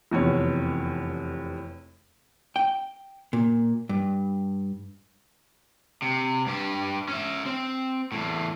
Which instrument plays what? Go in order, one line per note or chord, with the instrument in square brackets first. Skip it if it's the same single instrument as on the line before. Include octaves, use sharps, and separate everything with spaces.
[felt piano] F1 E2 C3 C#5
[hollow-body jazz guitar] G5
A#2
G2
[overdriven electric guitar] C3
G2 G4
C#4 E5
C4
E2 A2